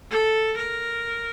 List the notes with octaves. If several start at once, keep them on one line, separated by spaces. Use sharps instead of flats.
A4
A#4